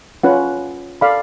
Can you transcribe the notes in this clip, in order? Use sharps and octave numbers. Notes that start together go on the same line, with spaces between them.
C#4 F4 B4 F#5
A4 D5 F5 B5